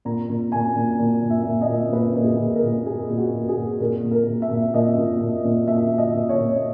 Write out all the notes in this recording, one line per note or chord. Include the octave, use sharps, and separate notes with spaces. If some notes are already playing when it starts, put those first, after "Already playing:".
A#2 A#5
A#2
A#2 G#5
A#2
A#2
A#2
E5
A#2
D#5
A#2
A#2 B4
A#2
G#4
A#2
A#4
A#2
A#2 G#4
A#2
F#4
A#2
G#4
A#2
A#2 A#4
A#2
A#4
A#2
E5
A#2
A#2 D#5
A#2
A#2
A#2
A#2 E5
A#2
D#5
A#2
C#5
A#2